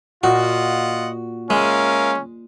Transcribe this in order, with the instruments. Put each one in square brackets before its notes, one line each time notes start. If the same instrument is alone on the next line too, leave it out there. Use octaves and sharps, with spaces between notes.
[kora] A#2 [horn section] F4 D#5 F#5 [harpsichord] F#4
[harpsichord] G#3 [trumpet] C#4 [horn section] A#4 E5 F5